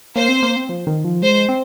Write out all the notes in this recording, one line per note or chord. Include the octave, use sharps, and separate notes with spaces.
A#3 C5
C4
A#3
C4
F3
D#3
F3
G#3 C5
C4